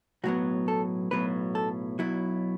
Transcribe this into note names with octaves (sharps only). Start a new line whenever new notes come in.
B1 A2 F#3 B3 F#4
A4
B1 A2 F#3 B3 B4
A4
B1 B2 F#3 E4